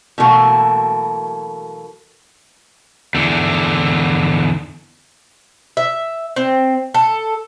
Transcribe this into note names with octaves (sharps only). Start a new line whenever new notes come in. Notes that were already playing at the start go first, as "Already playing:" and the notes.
B2 E3 F#3 A3 A#3
E2 D3
E5
C4
A4